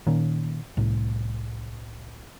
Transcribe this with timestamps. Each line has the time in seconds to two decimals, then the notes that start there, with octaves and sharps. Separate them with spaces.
0.07 A#2 D#3 A#3 C#4
0.77 C2 A2